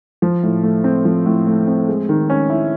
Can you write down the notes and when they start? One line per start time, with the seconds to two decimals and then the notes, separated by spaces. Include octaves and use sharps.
0.22 F3
0.43 A2
0.63 A3
0.84 C4
1.05 F3
1.26 A2
1.47 A3
1.68 C4
1.88 G#3
2.09 D#3
2.30 C#4
2.50 E4